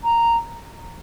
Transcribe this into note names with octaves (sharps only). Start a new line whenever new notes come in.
A#5